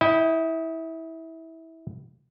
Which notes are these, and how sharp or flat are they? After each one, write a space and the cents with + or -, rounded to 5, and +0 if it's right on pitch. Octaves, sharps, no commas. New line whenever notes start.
E4 -20 D#5 +15 G5 +0